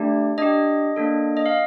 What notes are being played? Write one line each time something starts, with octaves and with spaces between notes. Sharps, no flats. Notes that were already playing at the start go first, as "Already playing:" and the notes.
Already playing: A3 D4 G4 D5
D4 G4 D#5
A#3 D4 A4
D#5
F5